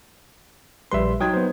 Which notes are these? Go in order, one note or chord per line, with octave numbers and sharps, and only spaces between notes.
A#1 G3 B4 E5 C6
F#3 D#4 G5 D#6 G#6
B3 C5